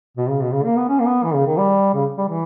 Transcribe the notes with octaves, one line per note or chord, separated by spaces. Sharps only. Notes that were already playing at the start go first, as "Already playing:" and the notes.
B2
C#3
B2
C#3
A#3
B3
C#4
A#3
B3
E3
C#3
D#3
G3
C#3
G3
E3